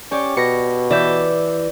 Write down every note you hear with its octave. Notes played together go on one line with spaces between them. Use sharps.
C#4 G4 C#5 D5
B2 A#6 C#7
E3 D5 E5 G6